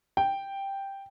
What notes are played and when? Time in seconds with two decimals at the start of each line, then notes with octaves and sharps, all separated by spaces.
0.17 G5